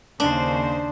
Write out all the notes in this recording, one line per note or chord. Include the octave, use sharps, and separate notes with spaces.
D#2 C#3 D4 C5